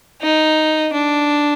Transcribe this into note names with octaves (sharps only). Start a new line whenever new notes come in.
D#4
D4